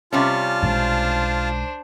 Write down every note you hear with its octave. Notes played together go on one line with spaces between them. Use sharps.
C3 G3 C#4 F4 A5 F6
B1 G#3 D4 C5